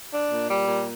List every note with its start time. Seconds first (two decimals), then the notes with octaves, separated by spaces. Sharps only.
0.11 D4
0.30 A#2
0.48 G3
0.67 A#2